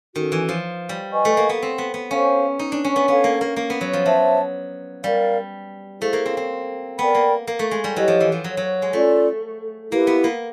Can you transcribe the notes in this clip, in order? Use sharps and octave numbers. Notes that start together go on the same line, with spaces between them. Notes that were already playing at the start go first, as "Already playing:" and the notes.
D#3 C#4 F#4 A4
E3
F3
G3
B4 D#5 G#5 C#6
A3
A#3
B3
C4
B3
B3
C#4 A4 C5 F5
D#4
D4
C#4
B3
B3 A4 C#5 F5
A#3
A#3
A#3
B3
F#3
F3
F#3 C5 E5 A5
G3 A#4 D5 F5
A3 E4 G#4 C5 F5
A#3
C4
C4
B3 A#4 D5 G5 B5
A#3
A#3
A3
G#3
G3
F#3 E4 G4 B4 D#5
F3
E3
F3
F#3
F#3
G#3
A3 C#4 F4 A4 D5
A#3 E4 G4 B4
B3
A#3